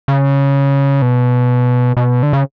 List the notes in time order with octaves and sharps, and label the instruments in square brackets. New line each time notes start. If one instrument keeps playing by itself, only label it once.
[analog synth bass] C#3
B2
B2
D3
C#3